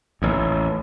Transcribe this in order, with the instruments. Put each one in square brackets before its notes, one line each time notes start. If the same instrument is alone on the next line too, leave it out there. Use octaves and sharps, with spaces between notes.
[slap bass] A1 D#2